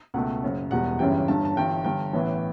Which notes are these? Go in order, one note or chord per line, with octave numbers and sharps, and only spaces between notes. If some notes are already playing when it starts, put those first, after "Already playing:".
C#2 B2 A3 F#5
F#1 F#2 C#3
E1 E2 B2 G3 F#5
G1 F#2 C#3 E3 G3 G5
G1 G2 D3 A5
A5
G1 G2 E3 G5
G1 G2 D3 G5
A1 A2 E3 B3